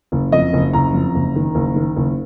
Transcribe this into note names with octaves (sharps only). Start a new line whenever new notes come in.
F#1
F2 D#5
F#1
F#1 A#5
F2
F#1
D#3
F#1
D#3
F#1